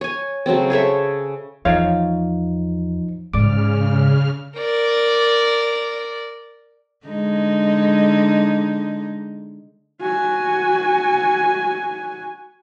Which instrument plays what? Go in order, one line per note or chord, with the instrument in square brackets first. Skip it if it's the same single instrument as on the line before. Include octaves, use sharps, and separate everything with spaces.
[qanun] C#5 G#5
C#3 F#3 A3 C4
G#4 A4 C#5 E5
[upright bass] E2 [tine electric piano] F3 D#4 [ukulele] C#5 F5
[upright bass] G#2 [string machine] C#3 F6 [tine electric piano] D5 D6
[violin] A#4 D5
[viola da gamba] D3 G#3 D#4
[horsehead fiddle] F#4 G#5